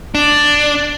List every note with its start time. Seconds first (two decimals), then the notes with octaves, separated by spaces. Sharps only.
0.15 D4